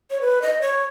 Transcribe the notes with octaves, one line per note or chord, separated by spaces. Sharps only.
C#5
B4
D#5
C#5